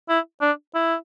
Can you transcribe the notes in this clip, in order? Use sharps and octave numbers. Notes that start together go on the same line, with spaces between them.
E4
D4
E4